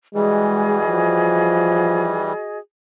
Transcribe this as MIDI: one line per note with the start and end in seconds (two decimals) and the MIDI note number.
0.15 2.33 52
0.15 2.33 55
0.15 0.79 56
0.15 2.58 66
0.15 2.58 68
0.15 2.58 75
0.88 2.20 53